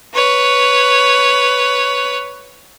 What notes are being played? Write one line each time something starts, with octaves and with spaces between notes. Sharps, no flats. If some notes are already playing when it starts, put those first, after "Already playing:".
B4 C#5